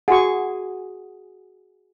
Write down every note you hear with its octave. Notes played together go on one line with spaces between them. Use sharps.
F#4 G#4 F#5 C#6